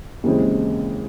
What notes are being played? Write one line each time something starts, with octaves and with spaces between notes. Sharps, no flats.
D#2 C#3 E3 G#3 C4